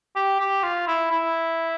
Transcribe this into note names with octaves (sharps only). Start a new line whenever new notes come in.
G4
G4
F4
E4
E4